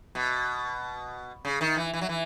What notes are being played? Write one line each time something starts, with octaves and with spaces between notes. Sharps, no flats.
B2
C#3
D#3
E3
E3
F#3
E3